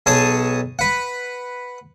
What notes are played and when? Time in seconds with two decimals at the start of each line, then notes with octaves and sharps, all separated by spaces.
0.06 B1 G#4 C#5 A5 D#6
0.79 B4 F#5